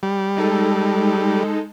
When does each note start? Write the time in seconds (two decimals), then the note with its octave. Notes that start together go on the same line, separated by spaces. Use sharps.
0.03 G3
0.37 G#3 D#4 A4